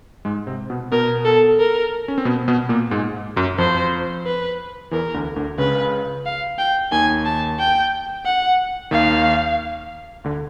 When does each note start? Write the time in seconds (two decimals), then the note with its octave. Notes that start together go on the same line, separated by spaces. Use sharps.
0.25 G#2 G#3
0.47 C3 C4
0.70 B2 B3
0.91 B2 B3 A#4
1.25 A4
1.59 A#4
2.08 C#4
2.18 C4
2.25 B2 B3
2.48 B2 B3
2.69 A#2 A#3
2.91 G#2 G#3
3.36 F#2 F#3
3.58 F2 F3 C5
4.26 B4
4.91 E2 E3 A#4
5.14 D2 D3
5.36 D2 D3
5.58 C#2 C#3 B4
6.25 F5
6.58 G5
6.92 D#2 D#3 G#5
7.25 A5
7.59 G5
8.25 F#5
8.91 D#2 D#3 F5
10.24 D2 D3